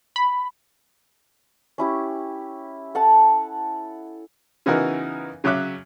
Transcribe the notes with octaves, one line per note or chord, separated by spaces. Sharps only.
B5
C#4 E4 G4
A4 F#5 A5
C#3 E3 B3 D#4 F#4 A#4
C#3 F#3 C#4 E5 D6 F#6